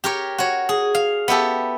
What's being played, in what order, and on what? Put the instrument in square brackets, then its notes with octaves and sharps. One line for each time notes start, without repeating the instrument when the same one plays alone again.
[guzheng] G4 A#4 C#5
F#4 C#5
G#4
F5
B3 E4 G4 A4